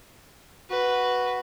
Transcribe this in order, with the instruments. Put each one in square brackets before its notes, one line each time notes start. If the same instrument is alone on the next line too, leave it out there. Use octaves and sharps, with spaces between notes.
[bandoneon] F#4 [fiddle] B4